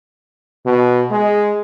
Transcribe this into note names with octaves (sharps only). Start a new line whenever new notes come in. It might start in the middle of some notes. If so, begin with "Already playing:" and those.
B2
G#3